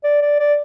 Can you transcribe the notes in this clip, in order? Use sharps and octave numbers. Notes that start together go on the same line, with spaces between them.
D5
D5
D5